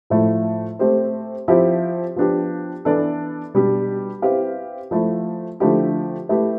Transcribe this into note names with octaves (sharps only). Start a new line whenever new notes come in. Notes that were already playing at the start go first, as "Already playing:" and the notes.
A2 F3 A3 E4
A3 C4 G4 C5
F3 C4 E4 G4
F3 B3 D4 G4
E3 B3 D4 A4 D5
B2 G3 D4 G4
C4 E4 G4 B4 F5
F3 A3 E4
D3 F3 A3 E4 G4
A3 E4 G4 B4